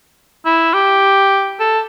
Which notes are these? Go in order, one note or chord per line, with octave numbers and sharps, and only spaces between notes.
E4
G4
A4